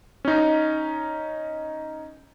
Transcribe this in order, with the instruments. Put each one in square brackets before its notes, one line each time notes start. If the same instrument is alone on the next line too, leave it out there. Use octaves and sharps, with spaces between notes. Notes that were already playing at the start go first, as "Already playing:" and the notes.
[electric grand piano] C#4 D#4